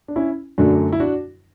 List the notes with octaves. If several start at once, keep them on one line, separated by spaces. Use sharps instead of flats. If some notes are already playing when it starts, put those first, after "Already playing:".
D4
C#4 E4
F#2 D3 F#3 A3 D4 F#4
E4
D4 F#4